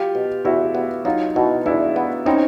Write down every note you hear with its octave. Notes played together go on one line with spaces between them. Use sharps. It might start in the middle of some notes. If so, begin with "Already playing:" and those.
Already playing: F#3 F4 G4
B2
E2 E4 F#4
B3
F#3 D#4 F4
B2 E4 F#4
E2 D4 E4
B3
C4 C#4 D#4